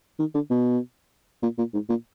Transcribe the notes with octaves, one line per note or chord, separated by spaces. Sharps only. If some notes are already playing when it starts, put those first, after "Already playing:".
D#3
D3
B2
A#2
A#2
G#2
A#2